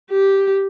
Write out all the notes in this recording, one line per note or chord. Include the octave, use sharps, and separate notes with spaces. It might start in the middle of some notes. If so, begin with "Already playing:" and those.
G4